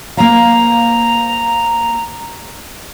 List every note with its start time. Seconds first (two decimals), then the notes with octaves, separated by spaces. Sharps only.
0.17 A#3 C5 F5 A#5